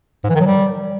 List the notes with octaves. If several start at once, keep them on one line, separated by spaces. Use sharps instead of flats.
G#2
E3
D#3
F#3
G3